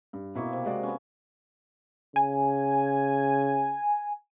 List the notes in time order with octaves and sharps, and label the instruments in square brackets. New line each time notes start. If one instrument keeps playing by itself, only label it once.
[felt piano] G2
[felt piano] B2 E4 C#6 [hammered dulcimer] A#3 C4
[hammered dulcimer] C3
[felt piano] G#3 F#4 D5
[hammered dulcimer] B3 C#4
[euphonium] C#3 [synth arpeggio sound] G#5